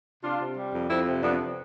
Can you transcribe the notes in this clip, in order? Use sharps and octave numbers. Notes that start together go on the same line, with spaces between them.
C3 D4 F4
C3
G3
F2
F2 C4 E4
C3
F2 B3 D4